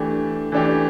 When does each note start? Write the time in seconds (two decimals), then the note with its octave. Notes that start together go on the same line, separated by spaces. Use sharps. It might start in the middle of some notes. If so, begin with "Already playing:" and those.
Already playing: E3 A3 D4 G4
0.52 E3 A3 D4 G4